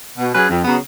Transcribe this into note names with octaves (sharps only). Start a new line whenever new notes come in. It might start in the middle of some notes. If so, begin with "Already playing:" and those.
B2
F#3 C#4 G#4 B4
F2
C#3 F#3 B3